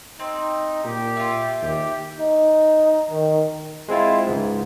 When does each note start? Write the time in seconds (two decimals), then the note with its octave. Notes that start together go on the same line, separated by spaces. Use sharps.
0.20 C4 D#4
0.84 A#2 G4
1.16 E4 F4
1.62 D#2 G4
2.19 D#4
3.11 D#3
3.88 G#3 C4 E4 F4
4.27 C#2 G#2